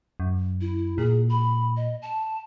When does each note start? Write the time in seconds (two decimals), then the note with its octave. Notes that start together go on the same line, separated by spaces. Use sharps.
0.20 F#2
0.61 E4
0.98 A#2 G#4
1.29 B5
1.77 D#5
2.02 A5